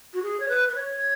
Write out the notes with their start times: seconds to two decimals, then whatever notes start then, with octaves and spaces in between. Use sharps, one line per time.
0.14 F#4
0.23 G#4
0.40 C#5
0.49 B4
0.68 B4
0.75 C#5